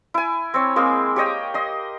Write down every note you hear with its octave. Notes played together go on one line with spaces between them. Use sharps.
E4 G#5
C4 C#5
G#3 A#3 C4 G#4
G4 C#5 D#5 G5
D#5 C6